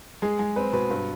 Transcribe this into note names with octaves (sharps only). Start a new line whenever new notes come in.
G#3 G#4
G#3
C4 B4
B2 B4
G2 B4